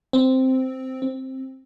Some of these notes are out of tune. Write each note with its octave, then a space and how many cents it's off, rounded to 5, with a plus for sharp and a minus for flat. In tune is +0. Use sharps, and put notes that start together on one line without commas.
C4 -5
C4 +10